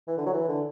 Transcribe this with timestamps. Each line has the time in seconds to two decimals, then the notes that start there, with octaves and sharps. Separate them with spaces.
0.08 E3
0.17 D3
0.26 F#3
0.33 E3
0.48 D3